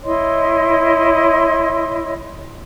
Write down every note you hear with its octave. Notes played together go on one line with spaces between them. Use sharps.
E4 C#5 D#5 C6